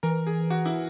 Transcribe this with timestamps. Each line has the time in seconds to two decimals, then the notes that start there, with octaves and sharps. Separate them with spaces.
0.03 E3 A#4
0.27 G#4
0.50 F#4
0.66 E4